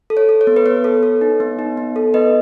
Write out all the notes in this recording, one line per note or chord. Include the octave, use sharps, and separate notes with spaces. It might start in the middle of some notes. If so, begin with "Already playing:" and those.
A4
C#5
A4
C#5
B3
B4
B3 C#5
A4
A4
D#4
B3
D#4
B3
A4
B3 B4 D#5